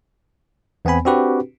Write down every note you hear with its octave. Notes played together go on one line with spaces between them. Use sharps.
E2 B3 C4 G#5 B5
C4 D4 F#4 G4 B4